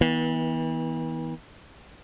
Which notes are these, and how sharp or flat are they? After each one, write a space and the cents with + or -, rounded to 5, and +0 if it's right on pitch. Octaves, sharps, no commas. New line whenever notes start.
E3 -40 B3 -20